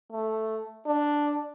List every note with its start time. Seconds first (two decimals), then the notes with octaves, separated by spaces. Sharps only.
0.12 A3
0.86 D4